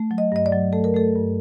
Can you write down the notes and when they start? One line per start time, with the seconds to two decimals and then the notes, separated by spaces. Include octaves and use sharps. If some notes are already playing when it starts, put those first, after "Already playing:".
Already playing: A3
0.11 F#3
0.18 D#5
0.32 G2 D#5
0.46 D5
0.52 F#3
0.73 A3 A4
0.84 A#4
0.94 A3 A4
1.15 G2